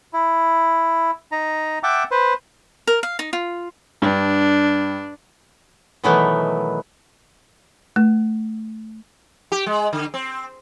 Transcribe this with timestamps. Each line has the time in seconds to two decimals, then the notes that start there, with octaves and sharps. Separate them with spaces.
0.13 E4
1.32 D#4 A#5
1.83 E5 F#5 G5 A5 D6
2.11 B4 C5
2.87 A#4
3.03 F5
3.19 D#4
3.33 F4
4.02 G2 D4
6.04 B2 D#3 E3 F#3 A3 B3
7.96 A3
9.52 G4
9.66 G#3
9.93 D3
10.14 C4